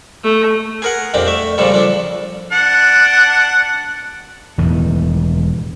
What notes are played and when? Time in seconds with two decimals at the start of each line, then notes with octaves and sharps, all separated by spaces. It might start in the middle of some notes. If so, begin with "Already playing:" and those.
0.24 A3
0.82 G#4 A#4 F#5
1.14 F2 A#2 D4 G4
1.27 A3 E5
1.58 A#2 C#3 F3 G3 A4
1.72 F3 D4 A4
2.52 D4 F#5
4.58 E1 E2 A2 D#3